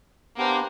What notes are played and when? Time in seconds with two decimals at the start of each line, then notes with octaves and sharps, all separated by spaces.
0.36 A#3 B3 D4 G4 C5